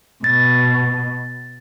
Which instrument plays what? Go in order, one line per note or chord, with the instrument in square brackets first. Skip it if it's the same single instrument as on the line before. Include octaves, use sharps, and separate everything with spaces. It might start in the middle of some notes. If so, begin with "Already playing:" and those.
[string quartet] B2 [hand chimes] A6